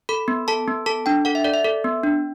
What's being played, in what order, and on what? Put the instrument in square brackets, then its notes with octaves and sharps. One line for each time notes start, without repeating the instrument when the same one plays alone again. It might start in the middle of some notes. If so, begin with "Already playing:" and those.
[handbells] A4 B5
B3
A4 A5
B3
A4 A5
D4 G5
A4 F#5
E5
A4 D5
E5
A4
B3
D4